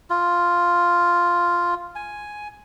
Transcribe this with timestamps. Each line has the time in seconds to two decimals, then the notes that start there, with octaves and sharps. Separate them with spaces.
0.10 F4
1.96 G#5